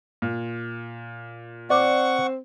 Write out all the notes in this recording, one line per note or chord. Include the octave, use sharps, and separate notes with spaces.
A#2
C4 D5 F#5 C#6